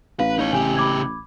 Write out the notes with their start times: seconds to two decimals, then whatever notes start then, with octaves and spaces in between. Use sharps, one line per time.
0.20 A1 B4 F5
0.39 D#4 C#5
0.53 C#3 G4 G#5
0.77 B5 D6 G#6